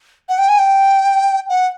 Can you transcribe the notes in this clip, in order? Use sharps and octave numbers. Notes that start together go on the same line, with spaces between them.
F#5
G5
G#5
G5
F#5